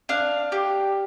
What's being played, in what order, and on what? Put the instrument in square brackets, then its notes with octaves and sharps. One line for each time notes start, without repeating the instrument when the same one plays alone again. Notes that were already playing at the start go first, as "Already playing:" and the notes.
[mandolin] D4 F5
G4